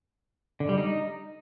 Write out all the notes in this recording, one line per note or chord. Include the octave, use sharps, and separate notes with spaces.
D3
G3
D#4